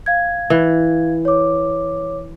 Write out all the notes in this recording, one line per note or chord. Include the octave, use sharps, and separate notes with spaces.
F5 G#6
E3
C#5 D6